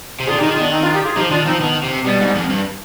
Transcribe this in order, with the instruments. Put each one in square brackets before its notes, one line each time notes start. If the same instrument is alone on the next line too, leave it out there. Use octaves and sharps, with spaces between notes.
[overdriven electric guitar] C3
[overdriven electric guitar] D3 [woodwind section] F4 G#4
[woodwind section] D#4 G4
[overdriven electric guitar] D#3
[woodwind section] F4 G#4
[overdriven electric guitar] D#3 [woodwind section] B3 D4
[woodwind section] C4 D#4
D4 F4
G4
F4 G#4
[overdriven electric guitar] F3 [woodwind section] D#4 G4
[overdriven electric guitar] D#3 [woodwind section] D4 F4
[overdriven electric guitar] F3 [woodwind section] C4 D#4
[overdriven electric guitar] D#3 [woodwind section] B3 D4
[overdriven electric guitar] C3
[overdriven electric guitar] B2 [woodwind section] G3 B3
[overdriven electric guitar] G#2
F2
G2